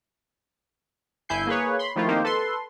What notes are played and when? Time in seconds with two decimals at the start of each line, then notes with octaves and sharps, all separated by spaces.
1.29 G1 E4 G#5 G6 C7
1.47 A#3 G#4 B4 C#5
1.79 B5 C6
1.96 D#3 F3 A3 E4 F4
2.08 D#3 A#3 C4 D#4 G4 C5
2.24 A4 B4 C6